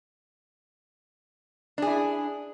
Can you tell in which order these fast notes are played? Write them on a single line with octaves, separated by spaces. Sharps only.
D4 G#4 E4